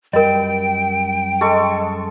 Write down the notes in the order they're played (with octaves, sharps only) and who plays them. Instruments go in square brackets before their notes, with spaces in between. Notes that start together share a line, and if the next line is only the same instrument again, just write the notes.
[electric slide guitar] F#2 G3 [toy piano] A#4 D#5 [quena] G5
[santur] G#3 A4 C#6